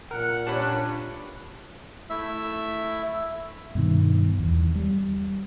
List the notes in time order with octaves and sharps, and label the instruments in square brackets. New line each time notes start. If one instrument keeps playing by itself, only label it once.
[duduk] A#2 [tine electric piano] A#4 [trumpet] F#5
[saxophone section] G2 C#4 D4 [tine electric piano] A5 B5
[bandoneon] A3 E4 E5 E6
[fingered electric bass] G2 B2 D#3
E2
G3